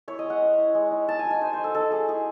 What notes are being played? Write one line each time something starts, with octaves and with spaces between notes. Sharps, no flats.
E4 C#5
D#5
G#3
F#5
C#4
E4
G#3
D#4
D#4 A5
G#5
F#3
G#5
D#4 C5
C5
F#3
A4
D#4 A4
F#3 G#4
E4 G#4